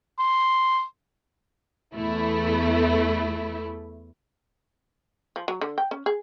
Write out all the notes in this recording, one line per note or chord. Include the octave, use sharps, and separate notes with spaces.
C6
E2 A3 E4
F3
F#3
D3
G5
C#4
G#4